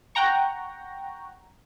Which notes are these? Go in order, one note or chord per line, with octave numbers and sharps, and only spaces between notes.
F#5 G5 A#5 C#6